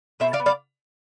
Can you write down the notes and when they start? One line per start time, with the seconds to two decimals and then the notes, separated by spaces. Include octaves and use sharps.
0.20 B2 C5 E5
0.33 D5 F5
0.40 B3
0.46 D5 F5